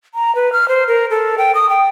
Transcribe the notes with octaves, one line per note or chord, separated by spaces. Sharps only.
A#5
B4
F6
C5
A#4
A4
G5
D#6
G5